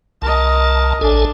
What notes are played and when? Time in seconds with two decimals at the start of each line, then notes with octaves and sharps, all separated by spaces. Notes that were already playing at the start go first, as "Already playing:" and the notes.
0.22 C2 A#4 D#5 A5
1.01 A1 D4 A4 G#5